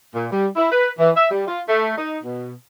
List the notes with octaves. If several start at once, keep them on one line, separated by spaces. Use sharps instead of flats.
A#2
G3
E4
B4
E3
E5
G3
F4
A3
D#4
B2